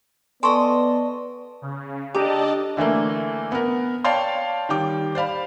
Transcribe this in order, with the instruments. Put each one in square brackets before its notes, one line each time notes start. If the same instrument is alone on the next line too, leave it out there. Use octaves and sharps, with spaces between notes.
[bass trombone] B3 [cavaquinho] A4 D#5 [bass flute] D5 [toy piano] G#5 C6 C#6
[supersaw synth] C#3
[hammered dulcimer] D4 D#4 A4 [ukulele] G4 [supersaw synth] D5 D#5 A5
[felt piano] D3 E3 A3 A#3
B3 A#4
C#5 D5 F5 G5 A5 C6
D#3 G3 G5 D6
C5 D5 F5 B5